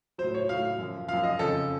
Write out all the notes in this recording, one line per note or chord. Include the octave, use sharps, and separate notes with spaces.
A2 F#3 C5
C#5
A2 F#3 F5
F#2 F3
F#2 F3 F5
D#5
F2 C#3 F3 A4